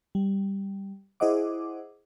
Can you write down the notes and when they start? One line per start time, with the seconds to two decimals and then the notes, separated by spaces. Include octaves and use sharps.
0.15 G3
1.20 E4 G#4 C5 D#5 F#5 D6